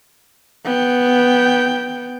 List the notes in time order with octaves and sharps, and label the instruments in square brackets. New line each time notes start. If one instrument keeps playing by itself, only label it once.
[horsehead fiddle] B3 G5